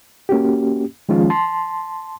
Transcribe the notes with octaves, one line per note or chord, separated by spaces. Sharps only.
A#3 C#4 F#4 G4
D#3 F3 G#3 C#4 F4
A5 C6